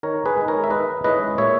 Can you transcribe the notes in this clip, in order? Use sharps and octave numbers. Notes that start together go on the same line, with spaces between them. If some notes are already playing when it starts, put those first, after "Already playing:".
D#3 A#4 C#5
G#4 B4
G#3 D#4
A#4 C#5
E5
D#3 B4 D#5
G#3 C#4 E4 B4 D#5
A#2 C#5 E5